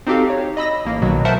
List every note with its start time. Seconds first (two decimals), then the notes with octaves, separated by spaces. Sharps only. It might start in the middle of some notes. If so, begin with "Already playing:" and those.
0.07 C4 D#4 F#4 G4 A4 F5
0.30 C#5
0.57 D#5 B5 E6 A#6
0.85 A1 A#3
1.02 B1 B2 D#3 F#3
1.25 A#4 C5 E5 F#5 A5